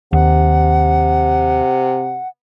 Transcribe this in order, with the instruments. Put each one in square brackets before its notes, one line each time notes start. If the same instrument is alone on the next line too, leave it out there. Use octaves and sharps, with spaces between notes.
[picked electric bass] D#2 [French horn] C3 [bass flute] F#5